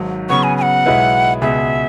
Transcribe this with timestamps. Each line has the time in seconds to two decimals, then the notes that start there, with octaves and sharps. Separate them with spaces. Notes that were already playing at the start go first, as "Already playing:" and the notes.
Already playing: G#1 G#2 F#3
0.29 C#3 F#3 B3 F#4 C#6
0.43 G#5
0.57 G#5
0.62 F#5
0.86 B1 B2 G#3 E4 B4
1.42 C#2 B2 B3 G#4 E5